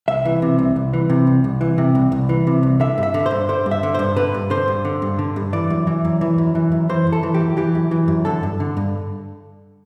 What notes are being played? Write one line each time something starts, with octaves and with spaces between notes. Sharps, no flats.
C2 E5
E3
C3
C2
C2
E3
C3
C2
C2
E3
C3
C2
C2
E3
C3
C2
D3 E5
G2
E5
D3
C5
G2
D3 C5
G2
E5
D3
G2 C5
D3 B4
G2
D3 C5
G2
D3
G2
D3
G2
E3 D5
F#2
E3
F#2
E3
F#2
E3
F#2
E3 C5
F#2
A4
E3
G4
F#2
E3 G4
F#2
E3
F#2
D3 A4
G2
D3
G2